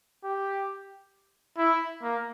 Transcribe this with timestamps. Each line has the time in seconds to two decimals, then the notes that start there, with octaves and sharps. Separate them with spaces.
0.24 G4
1.58 E4
2.03 A#3